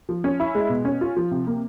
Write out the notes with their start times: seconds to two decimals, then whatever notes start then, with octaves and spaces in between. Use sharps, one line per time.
0.09 F3
0.24 C#4
0.40 E4
0.55 G#3
0.69 B2
0.85 C#4
1.01 F4
1.16 F3
1.31 C3
1.47 A#3